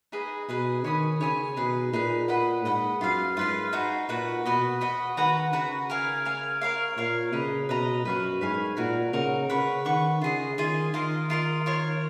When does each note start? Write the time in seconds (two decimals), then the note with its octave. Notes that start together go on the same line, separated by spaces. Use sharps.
0.12 D#4 G#4 B4 D#5
0.49 B2 D#4 G#4 B4 D#5
0.84 D#3 C#5 G#5 B5 D#6
1.21 C#3 C#5 G#5 B5 D#6
1.56 B2 D#4 G#4 B4
1.93 A#2 D#4 G#4 B4
2.28 B4 D#5 F#5
2.65 G#2 B4 D#5 F#5
3.01 F#2 F4 B4 F5
3.37 G#2 F4 B4 F5
3.73 D#4 F#4 B4
4.09 A#2 D#4 F#4 B4
4.45 B2 F#4 B4 D#5
4.81 F#4 B4 D#5
5.17 D#3 F#4 B4 F#5 A#5
5.53 C#3 F#4 B4 F#5 A#5
5.90 A#4 F5 G#5
6.25 A#4 F5 G#5
6.61 A#4 C#5 F5
6.97 A#2 A#4 C#5 F5
7.32 C#3 B4 D#5 A#5
7.69 B2 B4 D#5 A#5
8.05 F#2 B4 F5 G#5 C#6
8.41 G#2 B4 F5 G#5 C#6
8.77 A#2 D#4 F#4 A#4
9.13 C#3 D#4 F#4 A#4
9.49 C#3 B4 F#5 C#6
9.85 D#3 B4 F#5 C#6
10.21 C#3 F4 G#4 D#5
10.58 D#3 F4 G#4 D#5
10.94 D#3 F4 A#4 D#5
11.30 F4 A#4 D#5
11.66 F4 A#4 C#5